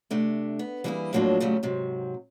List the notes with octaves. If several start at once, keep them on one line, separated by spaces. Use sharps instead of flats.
C3 A3 D4
B3
E3 G3 A#3 D#4 E4 G#4
A2 F3 F#3 A#3 D4 F4
A#2 C#3 F#3 G3 A3
G#2 C3 F#3